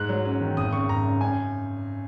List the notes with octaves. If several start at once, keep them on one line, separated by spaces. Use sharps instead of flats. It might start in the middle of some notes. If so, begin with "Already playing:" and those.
Already playing: G#2 F#6
F#3
C#4
D#3
G#1 D#6
C#3 C#6
G#1 A#5
F#2
F#2 G#5